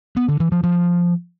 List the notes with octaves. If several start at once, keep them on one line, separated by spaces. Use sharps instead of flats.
B3
D3
E3
F3
F3